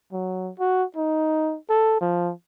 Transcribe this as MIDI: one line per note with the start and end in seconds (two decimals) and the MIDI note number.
0.12 0.52 54
0.60 0.84 66
0.96 1.57 63
1.69 2.00 69
2.01 2.32 53